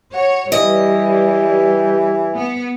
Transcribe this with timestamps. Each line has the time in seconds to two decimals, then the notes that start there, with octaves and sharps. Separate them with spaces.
0.14 F#4 C#5
0.52 E3 G3 G4 B4 D#5
2.33 B3